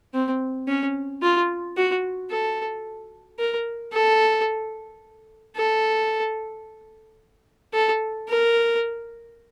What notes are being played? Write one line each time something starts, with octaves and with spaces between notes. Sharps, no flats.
C4
C#4
F4
F#4
A4
A#4
A4
A4
A4
A#4